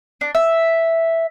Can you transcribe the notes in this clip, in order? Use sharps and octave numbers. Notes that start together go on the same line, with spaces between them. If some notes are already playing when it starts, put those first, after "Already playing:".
D4
E5